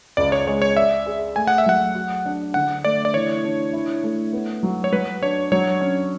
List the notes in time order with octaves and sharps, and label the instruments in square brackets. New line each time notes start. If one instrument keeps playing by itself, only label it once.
[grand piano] C#2 [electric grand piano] D5
[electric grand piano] C#5
[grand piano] G#3 [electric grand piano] C#5
[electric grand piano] C#5
[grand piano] D5 [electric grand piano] E5
[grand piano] G#4
[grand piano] A3 [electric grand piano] G#5
[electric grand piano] F#5
E5
[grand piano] F#3 [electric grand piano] F#5
[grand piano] F#4
D4
[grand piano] D3 [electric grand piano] F#5
[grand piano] A3 [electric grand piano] D5
[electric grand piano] D5
[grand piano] E3 [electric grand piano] C#5
[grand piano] D4
E4
A3
B3
F#3
[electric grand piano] C#5
[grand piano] F#3 [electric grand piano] B4
[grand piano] D4 [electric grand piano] C#5
[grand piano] F#3 [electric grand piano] C#5
[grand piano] C#4